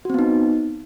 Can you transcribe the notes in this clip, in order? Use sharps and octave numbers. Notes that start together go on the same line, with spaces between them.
B3 C4 D#4 F#4